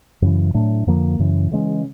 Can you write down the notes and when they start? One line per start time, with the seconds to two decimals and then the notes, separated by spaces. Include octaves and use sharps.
0.22 F#2 C#3 E3
0.54 A2 F#3 A3 D4
0.87 F2 D3 F3 A#3
1.19 F#2 C#3 E3
1.52 C#3 E3 G#3 C#4